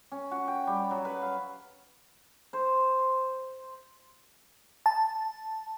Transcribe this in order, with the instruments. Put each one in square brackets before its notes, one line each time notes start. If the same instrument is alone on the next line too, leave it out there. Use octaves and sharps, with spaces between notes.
[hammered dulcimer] C#4
F#4
G5
G3
F#3
B4
F5
C5
[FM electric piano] A5